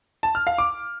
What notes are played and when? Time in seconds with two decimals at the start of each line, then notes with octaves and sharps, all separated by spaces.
0.23 A5
0.35 F6
0.47 F5
0.58 D6